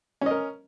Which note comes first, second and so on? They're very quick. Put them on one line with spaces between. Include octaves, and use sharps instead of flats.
C#4 D#5 A#4